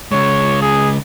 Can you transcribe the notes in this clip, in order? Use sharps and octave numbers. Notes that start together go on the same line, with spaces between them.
C#3 G#3 C#5
G#4